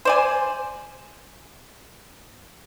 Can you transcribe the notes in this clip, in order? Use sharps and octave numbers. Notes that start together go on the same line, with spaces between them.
C5 D5 G#5